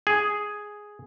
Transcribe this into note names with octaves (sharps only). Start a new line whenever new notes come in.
G#4